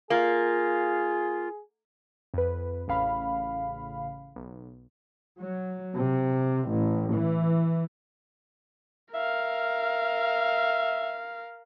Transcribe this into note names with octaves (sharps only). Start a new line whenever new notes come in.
A#3 F4 G#4
F2 B4
A1 C#3 F5 B5
B1
F#3
C3
A1
E3
A#4 E5 F5